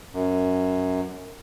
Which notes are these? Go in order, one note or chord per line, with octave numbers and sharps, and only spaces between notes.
F#2